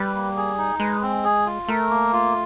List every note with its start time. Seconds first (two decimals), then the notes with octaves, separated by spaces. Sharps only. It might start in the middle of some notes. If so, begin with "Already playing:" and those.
Already playing: G3 B4
0.14 A#3
0.37 G#4
0.58 D#4
0.80 G#3 B4
1.02 C4
1.24 G#4
1.46 F4
1.68 A3 A#4
1.90 A#3
2.13 F4